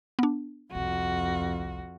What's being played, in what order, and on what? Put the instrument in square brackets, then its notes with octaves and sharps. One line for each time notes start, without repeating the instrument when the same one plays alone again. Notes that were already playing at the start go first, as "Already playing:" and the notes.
[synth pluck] B3 D4
[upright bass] G1 C2 [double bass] F2 [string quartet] F#4